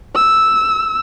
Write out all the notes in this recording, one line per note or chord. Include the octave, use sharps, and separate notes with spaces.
E6